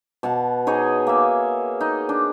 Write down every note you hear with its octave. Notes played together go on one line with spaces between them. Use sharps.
B2 F#5 A5
D#4 G#4 C#5 D#5
A#3 E5
D#4
D4